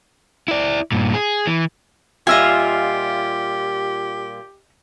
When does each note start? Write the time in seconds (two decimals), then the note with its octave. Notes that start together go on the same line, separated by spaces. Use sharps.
0.48 E4 D5
0.92 G2 A#2
1.14 G#4
1.47 E3
2.27 A#2 G3 F4 G4 D#5 E5 G#5